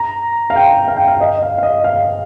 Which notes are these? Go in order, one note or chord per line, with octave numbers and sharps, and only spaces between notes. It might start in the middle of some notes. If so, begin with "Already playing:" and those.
Already playing: A#5
F5
G5
F5
G5
F5
D#5
F5
F5
D#5
F5